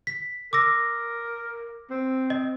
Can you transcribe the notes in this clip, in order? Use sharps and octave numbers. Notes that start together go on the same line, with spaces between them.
B6
A#4 D6 E6 A#6
C4
D#5